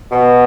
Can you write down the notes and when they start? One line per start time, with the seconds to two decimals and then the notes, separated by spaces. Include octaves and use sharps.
0.11 B2